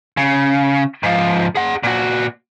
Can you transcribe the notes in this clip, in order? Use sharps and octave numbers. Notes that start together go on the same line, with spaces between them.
C#3
G#2 F3
G#4 F#5
A#2 F#4